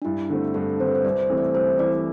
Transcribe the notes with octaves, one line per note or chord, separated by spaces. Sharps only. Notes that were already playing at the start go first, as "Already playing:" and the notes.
D4
G2 E4
D3 A3 C4
G2 A4
D3 A3 C4 C5
B4
C5
C2 D5
C5
C3 E3 A3 E4
D5
C2 C5
C3 E3 A3 E4 D5